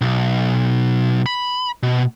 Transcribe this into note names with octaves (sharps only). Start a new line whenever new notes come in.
B1
B5
B2